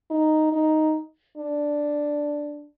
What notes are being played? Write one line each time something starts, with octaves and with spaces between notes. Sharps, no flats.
D#4
D#4
D4